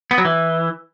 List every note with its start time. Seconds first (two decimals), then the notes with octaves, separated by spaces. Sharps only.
0.11 B3
0.18 F#3
0.25 E3